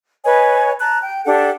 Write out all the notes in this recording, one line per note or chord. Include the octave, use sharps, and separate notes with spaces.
B4 C#5 D#5 G#5
A5 A#5 F#6
G5
D4 G4 A4 F#5